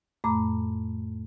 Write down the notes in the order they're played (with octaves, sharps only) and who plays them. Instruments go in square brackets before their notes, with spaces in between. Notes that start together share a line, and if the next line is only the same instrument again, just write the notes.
[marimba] F2 A2 A3 A#5 B5 D6